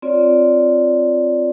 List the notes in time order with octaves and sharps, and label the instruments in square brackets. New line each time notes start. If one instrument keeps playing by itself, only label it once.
[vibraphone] C4 F4 C#5 D5